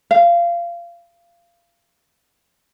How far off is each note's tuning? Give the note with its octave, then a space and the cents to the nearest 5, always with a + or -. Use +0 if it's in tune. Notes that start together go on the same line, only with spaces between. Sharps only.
F5 -20